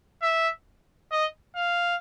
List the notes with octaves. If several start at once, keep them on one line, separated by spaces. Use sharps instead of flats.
E5
D#5
F5